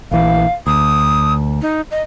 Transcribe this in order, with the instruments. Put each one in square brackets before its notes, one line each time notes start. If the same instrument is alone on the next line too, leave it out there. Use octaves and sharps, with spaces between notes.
[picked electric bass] A#1 E3 [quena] F5
[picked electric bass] D2 [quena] D#6
[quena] D#4
D#5